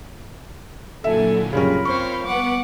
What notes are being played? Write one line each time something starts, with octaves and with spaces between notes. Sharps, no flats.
A#2 D3 F#3 E4 A4 E5 G#5
F#2 C#3 G3 C#4 F4 A#4 B5
C4 C5 C#5 F5 C#6
G3 B3 B4 F#5 D6